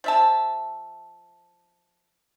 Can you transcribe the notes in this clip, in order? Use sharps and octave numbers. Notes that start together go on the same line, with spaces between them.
F3 E5 A5